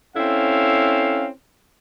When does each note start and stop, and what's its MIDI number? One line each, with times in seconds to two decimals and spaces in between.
0.16 1.28 60
0.16 1.28 61
0.16 1.28 64
0.16 1.28 69
0.16 1.28 77